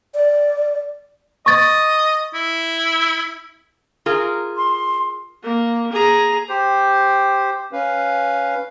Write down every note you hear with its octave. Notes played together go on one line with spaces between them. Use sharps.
D5
D#5 C#6 A6
E4
F4 G#4 A#4
C6
A#3
G#4 A#5
G4 C5
C#4 B4 F5